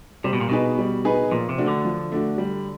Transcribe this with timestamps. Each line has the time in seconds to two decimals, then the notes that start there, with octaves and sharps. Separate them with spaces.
0.24 C3 G3
0.33 B2
0.41 A#2
0.49 B2 B3 D#4 G#4 B4
0.79 G3
1.05 B3 D#4 G#4 B4
1.31 A#2 F3
1.49 C3
1.58 A3 D4 F#4
1.68 D3
1.85 F3
2.12 A3 D4 F#4
2.38 G3